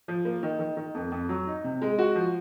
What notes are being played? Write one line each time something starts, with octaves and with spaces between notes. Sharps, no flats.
F3
A#3
D#3
D#3
D#3
F2
F2
F#3
D#4
C3
G#3
F#4
F3